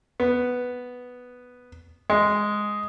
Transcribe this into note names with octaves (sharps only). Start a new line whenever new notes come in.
B3
G#3